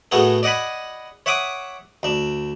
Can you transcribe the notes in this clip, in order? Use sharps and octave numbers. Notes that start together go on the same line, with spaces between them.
A2 B3 F#4 G#4 A4
D5 D#5 F#5 G#5 B5
C#5 E5 F#5 D6 D#6
D2 D4